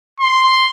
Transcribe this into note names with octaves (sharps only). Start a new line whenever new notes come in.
C6